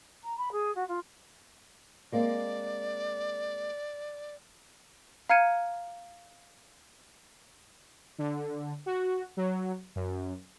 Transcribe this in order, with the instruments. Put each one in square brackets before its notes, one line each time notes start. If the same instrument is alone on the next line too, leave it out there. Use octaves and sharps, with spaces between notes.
[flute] A#5
B5
G#4
F#4
F4
[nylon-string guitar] G#3 A#3 C4 [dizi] D5
[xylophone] F5 A#5 F6 G#6 C#7 D#7
[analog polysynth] D3
F#4
F#3
F#2